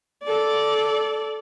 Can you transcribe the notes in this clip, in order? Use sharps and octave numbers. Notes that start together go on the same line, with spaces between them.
A4 D5